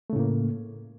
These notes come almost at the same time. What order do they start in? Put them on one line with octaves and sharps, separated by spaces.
A3 C#3 A2 A#3